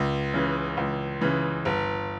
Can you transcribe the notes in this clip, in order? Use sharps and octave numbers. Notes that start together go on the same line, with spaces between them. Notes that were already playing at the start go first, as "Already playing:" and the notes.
Already playing: C#2
C#3 E3
C#2
C#3 E3
G1